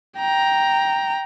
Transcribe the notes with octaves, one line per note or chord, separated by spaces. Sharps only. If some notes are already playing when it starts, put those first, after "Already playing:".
G5 A#5